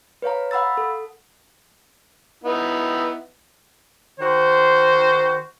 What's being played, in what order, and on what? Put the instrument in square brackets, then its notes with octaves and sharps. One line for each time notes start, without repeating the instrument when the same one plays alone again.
[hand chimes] B4 C#5 F5 A#5
F5 F#5 B5 E6 A6
A4
[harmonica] B3 D#4 E4
[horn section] D#3 F#4 C5